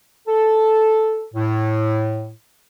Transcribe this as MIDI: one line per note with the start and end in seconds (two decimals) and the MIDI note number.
0.27 1.23 69
1.34 2.30 45